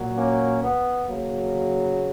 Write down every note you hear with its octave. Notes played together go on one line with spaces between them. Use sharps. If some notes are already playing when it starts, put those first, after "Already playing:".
Already playing: A#2 F#3
A#3 C#4
B3
C#3 F#3 A#3